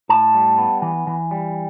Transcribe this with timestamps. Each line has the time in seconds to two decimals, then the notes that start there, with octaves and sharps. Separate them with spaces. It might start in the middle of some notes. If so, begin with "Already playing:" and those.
0.09 A2 A5
0.34 G3
0.58 B3
0.82 E3
1.07 E3
1.31 G3